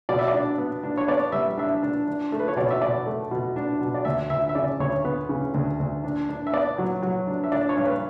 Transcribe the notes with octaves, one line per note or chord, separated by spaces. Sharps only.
B2 D5
E5
D5
D4
B3
D4
C#5
B3 D5
G3 E5
D4 E5
D4
D4
A3
B4
C#5
B2 D5
E5
B2 D5
A3
B2
D4
B2
D5
D2 E5
D2 E5
E5
C#3 D5
D2 C#5
B3 B4
C#3
D2
D2
D4
D4
E5
B3 D5
F#3
F#3
D4
E5
D4 D5
C#5
G2
B4